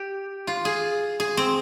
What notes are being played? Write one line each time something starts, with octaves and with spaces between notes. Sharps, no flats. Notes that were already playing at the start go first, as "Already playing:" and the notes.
Already playing: G4
F4
G#4
G#4
C4